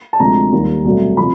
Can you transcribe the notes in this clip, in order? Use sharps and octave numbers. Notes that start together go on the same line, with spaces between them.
A5
D2 C3 F3 G#3 A#5
D#2 D#3 G3
C2 B2 F#3 A3
C3 F3 B5